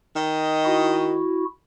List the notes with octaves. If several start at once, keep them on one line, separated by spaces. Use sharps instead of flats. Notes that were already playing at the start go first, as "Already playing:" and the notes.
D#3 D#4 D#5
E4 F#4